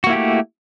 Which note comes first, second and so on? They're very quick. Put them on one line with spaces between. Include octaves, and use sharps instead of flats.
F#4 A#3 E4 G4 A3